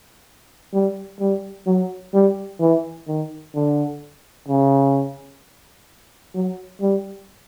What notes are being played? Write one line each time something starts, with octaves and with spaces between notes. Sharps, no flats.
G3
G3
F#3
G3
E3
D#3
D3
C#3
F#3
G3